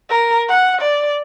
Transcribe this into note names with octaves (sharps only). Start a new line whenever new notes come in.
A#4
F#5
D5